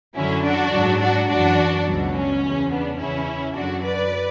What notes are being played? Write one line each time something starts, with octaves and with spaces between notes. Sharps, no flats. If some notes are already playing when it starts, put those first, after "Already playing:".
F#2 D3 F#3 C#4 E4
D4 F#4
G#2 F#3
D4 F#4
F#2 E3 D4 F#4
C#2 B2 F#3
C#4
E2 C#3 E3
B3 D4
E2 C#3 E3 C#4 E4
F#2 D3 F#3 D4 F#4
B4 D5